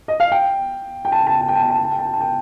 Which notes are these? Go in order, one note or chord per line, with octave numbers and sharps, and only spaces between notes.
D#5
F5
G5
G5
A5
G5
A5
G5
A5
G5
A5
G5
A5
G5
A5
G5
A5
G5
A5
G5